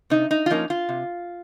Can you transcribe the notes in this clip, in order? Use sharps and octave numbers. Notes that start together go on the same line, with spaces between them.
C3 D#4
D#4
F4
F3 A#3 C#4 D#4
F4
C3